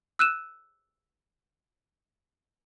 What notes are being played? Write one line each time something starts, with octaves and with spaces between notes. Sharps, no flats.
E6 F#6 D#7 E7